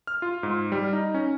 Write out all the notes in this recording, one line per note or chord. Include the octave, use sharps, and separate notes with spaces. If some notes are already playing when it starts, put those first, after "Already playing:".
F6
F4
G#2
G3
D#4
C#4